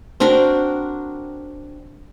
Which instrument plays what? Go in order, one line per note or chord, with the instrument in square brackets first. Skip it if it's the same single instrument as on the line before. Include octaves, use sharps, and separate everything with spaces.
[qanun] C4 D4 F#4 A#4